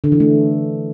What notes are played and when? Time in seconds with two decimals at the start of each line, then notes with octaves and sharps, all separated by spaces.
0.04 D3
0.12 E3
0.20 A3